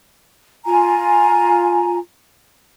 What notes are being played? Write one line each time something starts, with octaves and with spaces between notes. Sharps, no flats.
F4 G#5 A#5